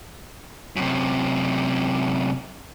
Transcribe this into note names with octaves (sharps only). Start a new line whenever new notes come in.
F#2 C3